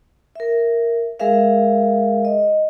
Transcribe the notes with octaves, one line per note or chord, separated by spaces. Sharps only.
A#4 E5
G#3 G#4 A#4 E5 F5
D#5